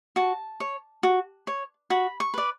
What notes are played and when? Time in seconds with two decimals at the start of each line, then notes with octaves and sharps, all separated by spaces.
0.16 F#4 A5
0.60 C#5
1.03 F#4
1.47 C#5
1.90 F#4 B5
2.20 C#6
2.34 B4 D5